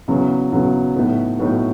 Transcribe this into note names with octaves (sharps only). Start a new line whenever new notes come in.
E2 C#3 F#3
E2 C#3 F#3
A2 F#3 B3 D#4
A2 F#3 B3 D#4